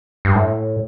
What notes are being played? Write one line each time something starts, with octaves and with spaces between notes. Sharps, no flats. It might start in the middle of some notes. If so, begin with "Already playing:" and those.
G2
A2